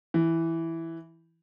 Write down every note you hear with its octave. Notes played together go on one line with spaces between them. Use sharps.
E3